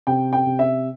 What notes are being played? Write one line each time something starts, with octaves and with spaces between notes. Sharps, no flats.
C3 G5
G5
C3
E5